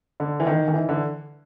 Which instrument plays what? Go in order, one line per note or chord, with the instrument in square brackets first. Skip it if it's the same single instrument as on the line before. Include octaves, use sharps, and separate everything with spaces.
[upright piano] D3
E3
D#3
D#3
E3
D3